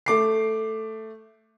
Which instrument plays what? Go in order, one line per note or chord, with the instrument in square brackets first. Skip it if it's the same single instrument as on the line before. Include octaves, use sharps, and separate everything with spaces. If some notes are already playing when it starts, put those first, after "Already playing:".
[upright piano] A3 D6 C7